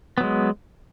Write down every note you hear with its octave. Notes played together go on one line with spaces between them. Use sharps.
F#3 G#3 B3